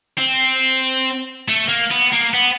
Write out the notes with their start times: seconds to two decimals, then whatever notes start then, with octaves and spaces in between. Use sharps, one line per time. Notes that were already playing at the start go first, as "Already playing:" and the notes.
0.18 C4
1.48 A3
1.69 A#3
1.91 B3
2.13 A#3
2.34 B3